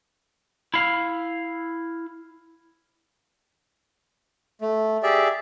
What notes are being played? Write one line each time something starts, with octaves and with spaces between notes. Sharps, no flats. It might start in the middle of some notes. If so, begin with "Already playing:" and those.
E4 F5
A3
G4 G#4 D5 E5